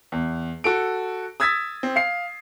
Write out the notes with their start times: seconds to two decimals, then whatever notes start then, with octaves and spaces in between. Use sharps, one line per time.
0.12 E2
0.64 F#4 A4 D7
1.40 D#6 E6 G#6 A6 B6
1.83 C4
1.96 F5 C7